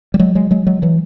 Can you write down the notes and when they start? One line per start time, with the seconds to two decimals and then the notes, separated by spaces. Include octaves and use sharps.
0.14 G3
0.19 F#3 G#3
0.35 F#3 G#3
0.51 F#3 G#3
0.67 F#3 G#3
0.82 E3 F#3